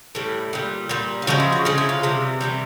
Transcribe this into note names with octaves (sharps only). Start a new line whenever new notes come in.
A2 E3 G3
A#2 G3
A#2 G3
F4
C#3 F3 G#3 F#4
E4
F#4
C#3 F3 G#3 F4
E4
F4
C3 E3 G3
C3 E3 G3